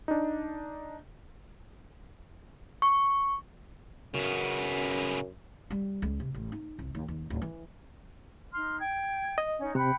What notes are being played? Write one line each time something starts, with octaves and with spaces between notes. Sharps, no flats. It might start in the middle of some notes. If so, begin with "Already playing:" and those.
D4 D#4
C#6
F#2 C#3 B3
G3
C#2
C3
A1
D#4
C2
D#2
D#2
D1
E3
D#4 C6 F6
G5 G#6
D#5
C#4 D#4
C3 F#5 G5 B5